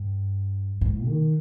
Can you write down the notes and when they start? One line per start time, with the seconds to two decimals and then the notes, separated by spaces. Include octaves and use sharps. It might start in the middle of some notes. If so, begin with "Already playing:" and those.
Already playing: G2
0.81 G#2
1.07 D#3